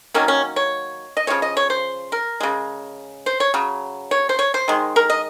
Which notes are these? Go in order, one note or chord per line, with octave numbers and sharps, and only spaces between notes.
D#3 F#3 A#3 C#4
C#4
C#5
D#5
C#3 F3 G#3 C#5
D#5
C#5
C5
A#4
C#3 G#3
C5
C#5
C#3 F#3
C#5
C5
C#5
C5
D#3 G#3
A#4
D#5